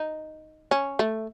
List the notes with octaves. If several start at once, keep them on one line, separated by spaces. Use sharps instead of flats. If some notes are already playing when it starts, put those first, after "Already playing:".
Already playing: D#4
C#4
A3